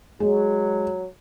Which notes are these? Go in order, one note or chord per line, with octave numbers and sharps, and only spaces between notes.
F#3 G#3